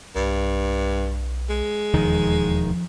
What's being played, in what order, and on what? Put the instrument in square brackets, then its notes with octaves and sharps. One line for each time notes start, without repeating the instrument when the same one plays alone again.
[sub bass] B1 [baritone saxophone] G2
[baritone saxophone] G#3
[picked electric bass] E1 D#2 D#3 [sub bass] F3